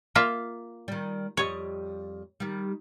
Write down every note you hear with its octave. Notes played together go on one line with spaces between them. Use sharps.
A#3 F4 E5
D#3 G3
F2 G3 C#5 D#5
D#3 G3